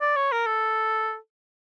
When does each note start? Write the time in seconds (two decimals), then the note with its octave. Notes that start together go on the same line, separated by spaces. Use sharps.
0.01 D5
0.16 C#5
0.32 A#4
0.47 A4